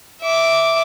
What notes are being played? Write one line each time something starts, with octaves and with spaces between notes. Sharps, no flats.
E5 D6